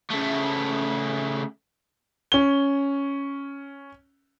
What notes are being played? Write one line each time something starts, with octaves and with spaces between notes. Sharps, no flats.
C#3 A3
C#4 G7